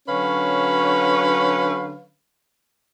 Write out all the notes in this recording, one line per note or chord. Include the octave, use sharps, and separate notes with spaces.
D3 F#3 C#4 B4 C#5 F5